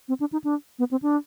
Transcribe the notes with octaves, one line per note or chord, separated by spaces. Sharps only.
C4
D4
D#4
D4
B3
C4
D4